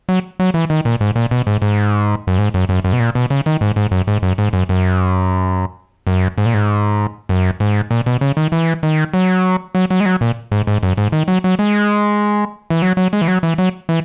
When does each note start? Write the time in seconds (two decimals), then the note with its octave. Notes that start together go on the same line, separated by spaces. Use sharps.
0.09 F#3
0.40 F#3
0.54 E3
0.70 D#3
0.85 A#2
1.01 G#2
1.16 A#2
1.31 B2
1.47 G#2
1.62 G#2
2.27 F#2
2.38 G#2
2.54 F#2
2.69 F#2
2.85 F#2
2.93 B2
3.00 A#2
3.15 B2
3.30 C#3
3.46 D#3
3.61 G#2
3.76 G#2
3.91 F#2
4.07 G#2
4.23 F#2
4.38 G#2
4.53 F#2
4.69 F#2
6.07 F#2
6.38 G#2
6.46 A#2
6.54 G#2
7.29 F#2
7.60 G#2
7.91 A#2
8.06 B2
8.21 C#3
8.37 D#3
8.52 E3
8.83 D#3
9.14 F#3
9.75 F#3
9.90 F#3
10.00 G#3
10.06 F#3
10.21 A#2
10.52 G#2
10.67 G#2
10.83 F#2
10.97 G#2
11.12 D#3
11.28 F#3
11.44 F#3
11.59 G#3
12.70 E3
12.82 F#3
12.97 F#3
13.13 G#3
13.22 E3
13.28 F#3
13.43 E3
13.58 F#3
13.89 E3